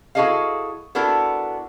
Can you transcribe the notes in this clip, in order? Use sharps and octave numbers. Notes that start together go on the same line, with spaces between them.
E4 F#4 G#4 A4 D#5 F5
B3 D4 E4 F#4 A4 A#4